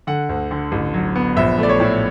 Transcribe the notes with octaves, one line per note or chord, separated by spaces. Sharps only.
D3 F#5
D2
D3
A1
F#3
B3
A#1 E5
A3 D5
C#5
A2